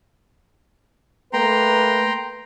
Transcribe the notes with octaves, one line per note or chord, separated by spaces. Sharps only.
A3 A#3 B4 G5 A#5 C6